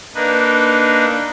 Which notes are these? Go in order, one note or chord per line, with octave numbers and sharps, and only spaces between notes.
A#3 D4 D#4 B4